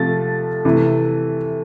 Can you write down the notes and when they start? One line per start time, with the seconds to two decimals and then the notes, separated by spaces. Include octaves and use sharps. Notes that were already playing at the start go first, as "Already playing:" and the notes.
Already playing: C3 F3 A3 A6
0.65 C3 E3 A3